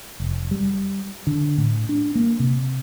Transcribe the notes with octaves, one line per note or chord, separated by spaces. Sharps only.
F1
G3
D3
A2
D4
A#3
C3